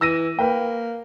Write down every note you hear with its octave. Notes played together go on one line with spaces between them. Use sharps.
E3 E6 A#6 D#7
A#3 B4 G5